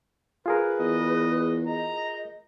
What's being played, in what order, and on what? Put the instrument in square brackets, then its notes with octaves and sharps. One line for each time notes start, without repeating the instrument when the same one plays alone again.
[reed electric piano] F4 G#4 A#4 [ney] B4
[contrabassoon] E2 [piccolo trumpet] D#5
[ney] D#5 [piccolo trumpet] A#5